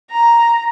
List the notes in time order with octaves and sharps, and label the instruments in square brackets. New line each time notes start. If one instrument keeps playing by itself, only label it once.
[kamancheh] A#5